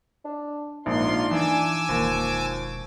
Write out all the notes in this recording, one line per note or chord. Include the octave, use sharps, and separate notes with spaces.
D4
A#1 G#2 D4 D#4 F4 C6
E3 G#5 D6 E6
E1 D#2 F3